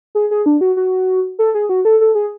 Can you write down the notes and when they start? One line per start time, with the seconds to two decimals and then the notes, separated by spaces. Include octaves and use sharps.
0.15 G#4
0.31 G#4
0.46 D4
0.61 F#4
0.77 F#4
1.39 A4
1.55 G#4
1.69 F#4
1.85 A4
2.01 A4
2.15 G#4